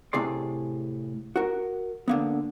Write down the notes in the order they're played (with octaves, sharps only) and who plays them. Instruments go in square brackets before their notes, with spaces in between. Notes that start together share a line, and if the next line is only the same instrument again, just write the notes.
[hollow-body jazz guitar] A2 C3 G#4 D5 C6
F#4 A#4
D3 A#3 B3